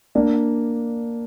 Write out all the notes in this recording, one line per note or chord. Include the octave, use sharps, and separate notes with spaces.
A#3 D4